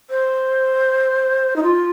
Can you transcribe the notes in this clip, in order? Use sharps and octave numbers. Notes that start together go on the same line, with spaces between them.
C5
D#4
F4